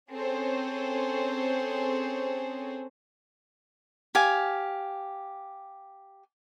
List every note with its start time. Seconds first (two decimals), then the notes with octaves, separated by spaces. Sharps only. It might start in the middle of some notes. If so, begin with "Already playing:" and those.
0.11 C4 C#4 G#4 A4 C5 C#5
4.15 G4 F5 G#5